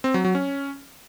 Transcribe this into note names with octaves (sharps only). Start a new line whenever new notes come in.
C4
F#3
F#3
C#4